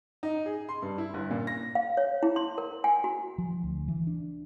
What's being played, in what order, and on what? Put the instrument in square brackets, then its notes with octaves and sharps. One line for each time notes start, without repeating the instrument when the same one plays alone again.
[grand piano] D#4
G#4
C6
G2
E4
G1
A#2
A#6
[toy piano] F5
C#5
E4
C6
A#4
G#5
F#4
[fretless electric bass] F3
D2
E3
D4